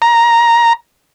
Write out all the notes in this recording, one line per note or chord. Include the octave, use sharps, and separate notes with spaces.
A#5